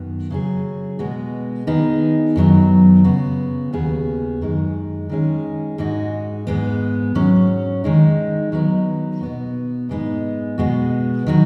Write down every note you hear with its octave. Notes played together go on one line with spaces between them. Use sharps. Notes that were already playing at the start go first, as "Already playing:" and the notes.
Already playing: F#2 D#3 B3
C#3 F#3 C#4 G#4
B2 G#3 B3 F#4
D#3 B3 D#4 G#4
F#2 D#3 F#3 B3
C#3 B3 F#4
D#2 C#3 B3 G#4
F#2 D#3 G#3
D#3 G#3 C#4 G#4
G#2 G#3 D#4 F#4
G#2 G#3 B3
G#2 F#3 C#4
D#3 G#3 D#4
D#3 F#3 B3
B2 B3 F#4
G#2 G#3 B3 D#4
B2 G#3 B3 F#4
D#3 F#3 B3 F#4